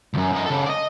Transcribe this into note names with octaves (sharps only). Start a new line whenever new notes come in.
C#2 F#2
F#2 D#5
C#3 A4
D5 D#5